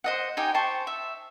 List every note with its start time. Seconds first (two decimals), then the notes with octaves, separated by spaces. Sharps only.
0.04 C5 D#5 F#5
0.37 D#4 G4 G5 G#5
0.54 C5 G5 A5 C#6
0.87 E5